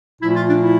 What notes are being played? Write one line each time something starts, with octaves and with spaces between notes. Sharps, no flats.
A#2 F3 A3 E4
F4
D4
E4